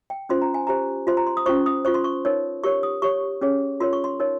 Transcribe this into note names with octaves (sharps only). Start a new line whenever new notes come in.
G5
C#4 F4 C5 C6
A#5
G#5
G4 C5 A#5
F4 C5 C6
A#5
C6
D#6
C#4 F4 C5 C#6
D#6
F4 C5 C#6
C6
C#6
D#4 A#4 C#5
G4 A#4 C#5 C#6
D#6
G4 C#5 C#6
C#4 G#4 C#5
F4 A#4 C#5 C6
C#6
C6
D#4 A#4 C#5